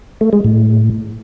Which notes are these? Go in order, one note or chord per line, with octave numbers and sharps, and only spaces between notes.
A3
G#3
A2